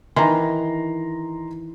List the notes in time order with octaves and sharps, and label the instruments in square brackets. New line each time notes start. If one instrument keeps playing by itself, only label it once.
[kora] D#3 E3 [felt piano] D#4 A#5 C6